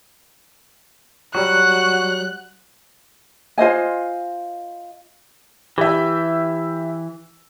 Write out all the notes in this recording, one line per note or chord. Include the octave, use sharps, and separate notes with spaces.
F#3 G3 F#4 F#5 F#6
F4 C5 D#5 G#5
E3 G4 E5